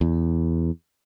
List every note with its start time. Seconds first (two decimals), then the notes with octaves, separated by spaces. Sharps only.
0.01 E2